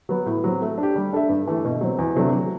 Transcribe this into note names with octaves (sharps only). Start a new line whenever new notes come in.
F#3 B3
A2
F#3 C4
A3
D4
G4
G3
D4 A4 E5
G2
E3 A3
B2
F#3 C4
E2
C3 F#3 A3 D4
F#3